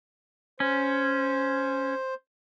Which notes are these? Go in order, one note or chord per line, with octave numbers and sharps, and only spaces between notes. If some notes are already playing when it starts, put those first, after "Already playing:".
C#4 C5